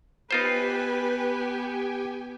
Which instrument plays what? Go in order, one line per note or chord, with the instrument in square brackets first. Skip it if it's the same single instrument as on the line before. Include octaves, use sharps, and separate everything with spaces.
[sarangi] B3 [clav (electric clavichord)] D#4 F4 C5 [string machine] G4 G5 G#5 [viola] B4